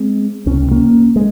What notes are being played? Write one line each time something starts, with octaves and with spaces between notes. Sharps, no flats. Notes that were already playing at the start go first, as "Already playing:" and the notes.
Already playing: G#3 C4
C#2 C3 C#4
A#3 C#4
G#3